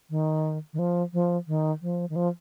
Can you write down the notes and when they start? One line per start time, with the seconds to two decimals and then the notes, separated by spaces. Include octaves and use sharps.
0.10 D#3
0.73 D#3
0.79 F3
1.13 F3
1.47 D#3
1.82 F3
2.09 D#3
2.16 F3